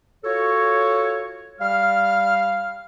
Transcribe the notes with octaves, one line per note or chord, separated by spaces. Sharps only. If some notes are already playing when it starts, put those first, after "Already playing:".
F4 F#4 A4 C#5
G3 F5 F6